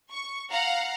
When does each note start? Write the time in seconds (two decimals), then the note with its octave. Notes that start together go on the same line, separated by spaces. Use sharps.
0.12 C#6
0.51 F5 F#5 A#5